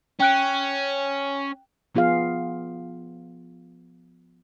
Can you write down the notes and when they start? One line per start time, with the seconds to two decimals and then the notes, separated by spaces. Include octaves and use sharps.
0.20 C#4 G5 F#6 D7
1.95 F3 B3 F4 G#4 F5